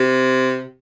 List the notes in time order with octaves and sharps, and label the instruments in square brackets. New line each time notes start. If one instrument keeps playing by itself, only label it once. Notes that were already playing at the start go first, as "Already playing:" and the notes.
Already playing: [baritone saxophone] C3